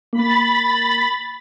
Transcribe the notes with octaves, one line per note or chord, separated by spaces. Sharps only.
A#3 B5 A6